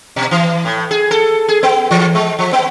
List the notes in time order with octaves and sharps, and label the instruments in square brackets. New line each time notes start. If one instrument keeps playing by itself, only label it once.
[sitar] B2
E3
A2
G#4
A4
G#4
B3
E3
G#3
F3
B3